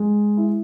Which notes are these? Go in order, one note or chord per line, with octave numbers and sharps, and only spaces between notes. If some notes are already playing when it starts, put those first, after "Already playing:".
Already playing: G#3
E4